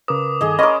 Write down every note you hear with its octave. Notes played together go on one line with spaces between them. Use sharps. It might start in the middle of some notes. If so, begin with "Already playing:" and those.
C#3 A#4 B4 D6 D#6
G2 D#3 G#4 A4 D#5
C#4 A#4 D#5 B5 C6 D6